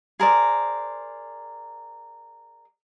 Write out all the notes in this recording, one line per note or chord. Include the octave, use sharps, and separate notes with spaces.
G#4 A#4 C5 D5